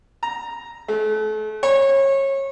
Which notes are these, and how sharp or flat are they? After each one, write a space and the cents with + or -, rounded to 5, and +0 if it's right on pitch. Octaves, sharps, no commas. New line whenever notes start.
A#5 +0
A3 -35
C#5 -25